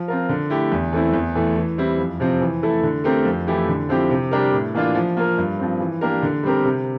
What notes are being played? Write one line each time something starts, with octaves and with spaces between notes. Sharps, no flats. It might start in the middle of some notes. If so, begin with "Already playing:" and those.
Already playing: F3
C4 F4 A#4
D3
A3 E4 G4
E2
E3 A3 C4 E4
E2
E3 A3
E3
G3 C4 E4
F2
C3 F3 C4
E3
A3 E4 A4
D3
A3 C4 G4 A#4
F2
E3 A3 E4 G4
D3
F3 C4 E4 G4
C3
G3 D4 G4 A#4
A2
E3 A#3 D4 F4
F3
A#3 F4 A#4
G2
F3 C4
E3
A#3 D4 G4 A#4
D3
G3 C4 G4 A#4
C3